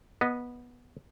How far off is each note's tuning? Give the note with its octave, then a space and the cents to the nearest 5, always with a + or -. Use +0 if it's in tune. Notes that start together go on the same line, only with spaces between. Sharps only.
B3 -15 D#5 +0